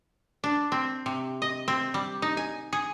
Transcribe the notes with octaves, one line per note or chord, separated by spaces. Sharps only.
D4
C4
C3
D#5
C4
G3
D#4
G#5
G#4